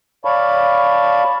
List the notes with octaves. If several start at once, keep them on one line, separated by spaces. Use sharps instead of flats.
C#5 D5 F5 A5 B5 C#6